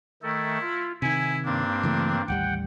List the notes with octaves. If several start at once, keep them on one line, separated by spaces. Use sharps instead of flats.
D#3 A3 E4 A4
F4
C3 D#3 E4 G#5
G2 A#3 C4 D4
C#3 E3 A3
A1 D#2 G3 F#5 G5